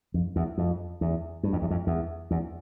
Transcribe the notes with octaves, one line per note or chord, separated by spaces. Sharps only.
F2
E2
F2
E2
G2
F2
E2
F2
E2
E2